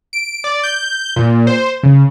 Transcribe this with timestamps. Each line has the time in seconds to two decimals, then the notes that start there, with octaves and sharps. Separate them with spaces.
0.13 D7
0.44 D5
0.63 G6
1.16 A#2
1.47 C5
1.83 C#3